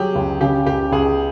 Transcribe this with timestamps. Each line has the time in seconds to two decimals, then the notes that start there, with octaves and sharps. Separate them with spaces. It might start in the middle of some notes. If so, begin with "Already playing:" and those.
Already playing: F#3 G4 G#4
0.15 C#2
0.41 C#3 G4
0.66 C#2 G4
0.92 C#2 G#4